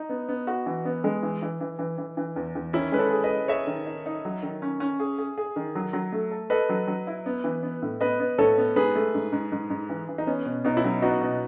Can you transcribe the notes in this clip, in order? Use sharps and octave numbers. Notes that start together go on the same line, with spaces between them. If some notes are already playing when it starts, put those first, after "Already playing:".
Already playing: D#4
B3
B3
F#4
E3
B3
G#3
E3
E3
E3
E3
E3
E3
E2
E2
D#3 C#4 E4
G#3 B4
A4 C#5
G#4
B4 D#5
G#4
G#4 C#5 E5
D#3
D#4
D#4
F#3
D#3
C#4
C#4
G#4
G#4
G#4
D#3
F#3
F#3
A3
A4
A4 B4 D#5
F#3
F#3
E4
B3
E3
B3
A2
B3 B4 D#5
B3
A2 A4 C#5
B3
G#2 G#4 B4
A3
G#2
G#2
G#2
G#2
E3
E3
D#4
B3 C#4
B2
B2 D#4
C#4 E4
F#3
B3 D#4 F#4
B2